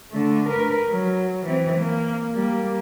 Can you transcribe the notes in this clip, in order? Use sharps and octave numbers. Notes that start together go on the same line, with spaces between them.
D3 A3
A#4 B4
F#3
E3 C4
A#3
G3 A#3